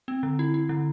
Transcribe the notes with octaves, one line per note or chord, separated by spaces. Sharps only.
C4
D3
E4
E4
D3